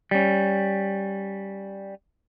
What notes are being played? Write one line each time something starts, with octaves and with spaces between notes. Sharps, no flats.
G3 C#4